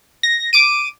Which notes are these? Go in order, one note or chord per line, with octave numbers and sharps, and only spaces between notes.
A#6
D6 D7 D#7